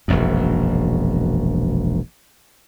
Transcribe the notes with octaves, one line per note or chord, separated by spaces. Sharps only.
E1 A#1 F#2